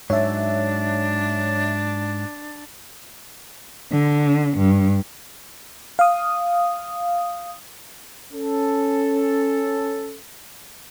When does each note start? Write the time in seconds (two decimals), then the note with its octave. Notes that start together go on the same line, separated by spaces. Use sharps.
0.10 G#2 F#3 D4 C#5 E5
3.92 D3
4.57 G2
5.99 F5 D#6
8.33 C#4 A4